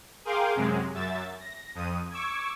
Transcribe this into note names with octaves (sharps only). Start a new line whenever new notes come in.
G#4 A#4 F5 G5 C6 D6
F#2 C3 G#3
F#2 E5 A6
A#6
F2 D#6
C#6 D6 E6 G#6